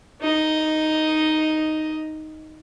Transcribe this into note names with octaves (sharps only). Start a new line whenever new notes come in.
D#4 D#5